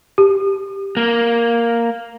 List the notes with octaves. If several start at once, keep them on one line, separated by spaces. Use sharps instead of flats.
G4
A#3